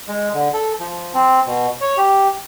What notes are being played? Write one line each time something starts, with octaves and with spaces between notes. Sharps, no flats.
G#3
D3
A4
F3
C4
B2
C#5
G4